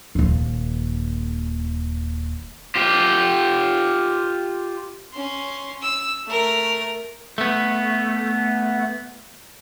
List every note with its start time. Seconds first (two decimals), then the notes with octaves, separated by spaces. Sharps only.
0.15 D#1 D#2
2.75 F4 G4
5.13 C#4 C6
5.82 E6
6.26 A3 A#4
7.38 A3 B3